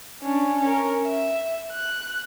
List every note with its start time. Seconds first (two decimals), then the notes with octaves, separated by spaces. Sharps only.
0.22 C#4 D4
0.61 C#4 A#4
1.04 E5
1.72 F#6